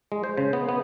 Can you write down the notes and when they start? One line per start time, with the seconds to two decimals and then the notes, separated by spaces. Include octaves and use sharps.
0.12 G#3
0.24 C5
0.37 C#3
0.53 B3
0.69 B3